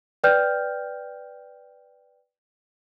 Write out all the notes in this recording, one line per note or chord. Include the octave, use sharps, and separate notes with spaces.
B4 D5 G5 F6 G6